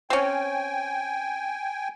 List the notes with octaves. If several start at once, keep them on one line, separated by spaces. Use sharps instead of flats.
C4 C#4 G5 G#5